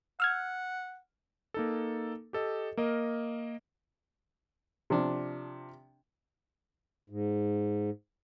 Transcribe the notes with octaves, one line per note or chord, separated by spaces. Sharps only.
F#5 E6 F6 G#6
A#3 D#4 A4
G4 A4 D#5
A#3 A#4 D#5
C3 F3 D4
G#2